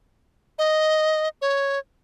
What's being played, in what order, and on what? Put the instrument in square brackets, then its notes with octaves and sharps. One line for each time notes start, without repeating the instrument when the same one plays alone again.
[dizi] D#5
C#5